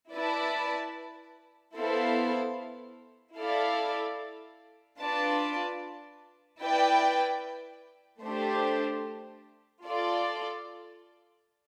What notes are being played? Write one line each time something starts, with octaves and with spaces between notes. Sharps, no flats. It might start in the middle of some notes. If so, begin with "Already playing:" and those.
E4 B4 D5 A5
B3 E4 A4 C5 F5
E4 A4 D5 F5
D4 F4 B4 D5 A5
E4 B4 D5 G5
A3 D4 G4 C5
F4 A4 D5